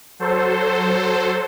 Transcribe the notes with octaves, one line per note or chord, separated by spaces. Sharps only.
F#3 A4 C5